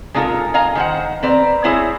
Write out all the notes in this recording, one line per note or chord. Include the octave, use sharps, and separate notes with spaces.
G#3 D4 D#4 F4 A4 A#4
D#5 F5 G#5 A#5
D#3 C5 F#5
C4 B4 D5 A#5
G#3 C4 E4 G#4 C5 C#5